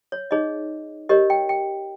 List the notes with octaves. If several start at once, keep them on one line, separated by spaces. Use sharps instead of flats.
C#5
D#4 G#4 C#5 D#5
G4 A#4 C#5 D#5
G5
G5